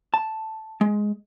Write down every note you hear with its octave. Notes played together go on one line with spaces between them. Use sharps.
A5
G#3